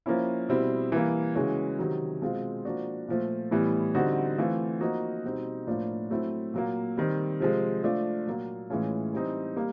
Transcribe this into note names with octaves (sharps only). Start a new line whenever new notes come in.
F3 A#3 C#4 E4
B2 G3 C4 E4
E3 G3 A#3
C#3 E3 G#3 C#4 F#4
C3 D#3 F#3
B2 G#3 C4 F4
F3 A#3 D4 F#4
A#2 F3 A3
A2 E3 G3 B3
D3 G3 C4 D#4 F#4
E3 A3 C4 F4
F3 A#3 D#4 F#4
B2 G3 C4 D#4
A2 F3 A#3 D4 F4
F#3 A3 C4 E4
A#2 F#3 A#3
D#3 G3 C4
C3 F3 G#3
F3 A3 D4 F4
A#2 F#3 A#3
A2 E3 G#3 C#4 F4
E3 G3 C4 D#4
G3 A#3